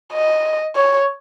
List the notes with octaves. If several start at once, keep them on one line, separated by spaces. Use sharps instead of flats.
D#5
C#5